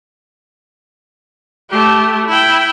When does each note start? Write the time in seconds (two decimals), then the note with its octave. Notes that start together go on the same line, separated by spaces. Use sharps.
1.70 A3 G4
2.27 E4 G5